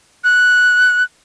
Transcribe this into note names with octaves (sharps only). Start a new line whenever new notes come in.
F#6